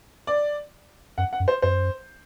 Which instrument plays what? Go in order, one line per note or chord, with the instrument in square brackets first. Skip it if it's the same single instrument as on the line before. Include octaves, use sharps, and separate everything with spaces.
[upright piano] D5
[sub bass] F#2 [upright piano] F#5
[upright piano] F#5
[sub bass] F#2
[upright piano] C5
[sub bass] F#2 [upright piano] C5